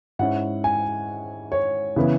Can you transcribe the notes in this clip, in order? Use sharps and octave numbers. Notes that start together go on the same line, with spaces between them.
G#2 G#3 C#4 E4 F#5
G#5
C#5
C#3 E3 B3 E4